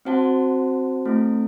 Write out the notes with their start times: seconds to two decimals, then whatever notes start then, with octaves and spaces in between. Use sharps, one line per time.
0.05 C4 F#4 C5 F#5 A5
1.05 A3 C4 E4 A4